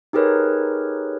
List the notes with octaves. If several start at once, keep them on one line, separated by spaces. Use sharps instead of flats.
D#4 G4 G#4 A#4 B4 C#5